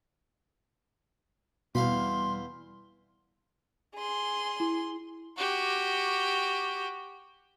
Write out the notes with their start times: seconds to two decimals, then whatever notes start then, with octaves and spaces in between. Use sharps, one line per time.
1.75 E2 B2 G3 E5 F5 B5 C6
3.96 G#4 C6
4.60 E4
5.38 F#4 G4